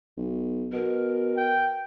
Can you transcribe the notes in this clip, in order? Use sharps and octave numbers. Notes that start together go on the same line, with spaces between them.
B1
B2 A#4
G5